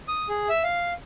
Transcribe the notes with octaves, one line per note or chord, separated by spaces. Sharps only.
D#6
G#4
E5
F5